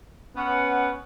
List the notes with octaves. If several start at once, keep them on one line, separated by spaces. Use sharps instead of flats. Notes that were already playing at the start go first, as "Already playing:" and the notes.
B3 C#4 F#5